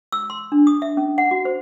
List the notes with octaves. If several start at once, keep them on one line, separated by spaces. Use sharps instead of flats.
E6
C6
D4
D#6
E5
C#4
F#5
F#4
C5